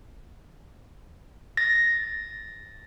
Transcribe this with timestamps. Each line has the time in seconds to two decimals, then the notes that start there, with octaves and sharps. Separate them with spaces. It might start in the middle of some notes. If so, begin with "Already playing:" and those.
1.57 A6 A#6